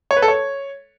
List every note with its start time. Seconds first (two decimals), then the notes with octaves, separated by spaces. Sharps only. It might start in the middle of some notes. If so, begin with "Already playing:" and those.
0.11 C#5
0.16 B4
0.22 A4
0.28 C#5